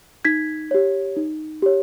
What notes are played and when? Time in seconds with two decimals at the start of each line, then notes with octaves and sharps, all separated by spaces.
0.25 D#4 G#6 B6
0.71 G4 C#5
1.16 D#4
1.62 G4 C#5